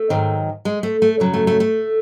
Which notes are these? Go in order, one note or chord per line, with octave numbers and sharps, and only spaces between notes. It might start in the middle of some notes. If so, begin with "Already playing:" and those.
Already playing: A3
G#2 D#3 F#3
G#3
A3
A3
F#2 C#3 F#3
A3
A3
A3